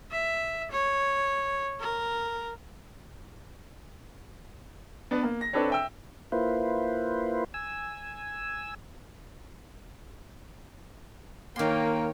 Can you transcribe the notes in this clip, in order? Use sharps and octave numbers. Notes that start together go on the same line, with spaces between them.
E5
C#5
A#4
B3 D4 B4
A#3
A#6
C4 D4 A4 B4 C#5
E5 G5 E6
A#3 E4 F4 B4 C5
G#5 E6
D#3 A#3 A#4 C#5 G5 C6